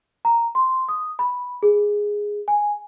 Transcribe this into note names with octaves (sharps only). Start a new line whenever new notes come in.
A#5
C6
D#6
B5
G#4
G#5